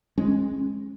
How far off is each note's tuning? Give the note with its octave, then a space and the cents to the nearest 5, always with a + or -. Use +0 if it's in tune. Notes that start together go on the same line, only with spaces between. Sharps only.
G#3 +0 C#4 -35